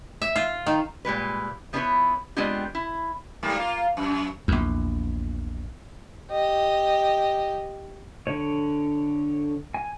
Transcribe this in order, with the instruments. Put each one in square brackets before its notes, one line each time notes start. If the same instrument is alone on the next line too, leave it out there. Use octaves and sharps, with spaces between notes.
[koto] E5
F4
D#3
[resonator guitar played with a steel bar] A#2 G3 G#3 B4
F3 B3 D4 E4 B4 C#5
G#3 B3 C4 D4 F4 G4
E4
[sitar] G#2 G3 A#3
A#3 F4
F#2
[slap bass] A#1 E2
[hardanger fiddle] G4 D#5
[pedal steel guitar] D3 C#5
G#5